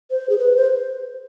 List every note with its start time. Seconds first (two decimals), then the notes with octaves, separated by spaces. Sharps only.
0.11 C5
0.29 G#4
0.39 B4
0.57 C5